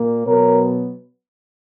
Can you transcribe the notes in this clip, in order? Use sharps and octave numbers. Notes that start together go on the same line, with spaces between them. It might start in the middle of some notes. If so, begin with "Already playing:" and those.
Already playing: A#2 A#3
B2 F#3 B3 A#4 C#5